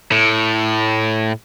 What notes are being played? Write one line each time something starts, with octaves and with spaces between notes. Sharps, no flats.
A2